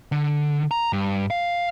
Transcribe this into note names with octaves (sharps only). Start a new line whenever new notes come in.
D3
A#5
G2
F5